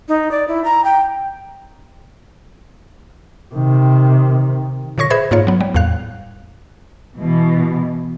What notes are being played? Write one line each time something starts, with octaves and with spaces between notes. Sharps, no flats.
D#4
D5
E4
A#5
G5
C3 D#3
A#2 D3 C#5 C#6 A#6
G#4 B4 C5 E5 B5 G#6
G#2 A#3 F4 C#5
F#3 B3
G3
E2 A2 F5 F#6
B2 E3